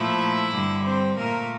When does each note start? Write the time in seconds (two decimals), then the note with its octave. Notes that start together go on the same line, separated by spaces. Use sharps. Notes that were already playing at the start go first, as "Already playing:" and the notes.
Already playing: A#2 F3 A3 E4 E5
0.52 G2 D3 G3
0.83 C4 C5
1.16 A#2 A3 A#3 A#4